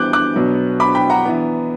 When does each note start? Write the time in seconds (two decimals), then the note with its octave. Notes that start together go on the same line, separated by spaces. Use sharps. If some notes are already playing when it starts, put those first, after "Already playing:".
Already playing: E3 G3 B3 D4 D6 F#6 G6
0.13 D6 F#6
0.35 B2 F#3 B3 D4
0.80 B5 D6
0.95 G5 B5
1.10 F#5 A#5
1.24 E3 B3 D4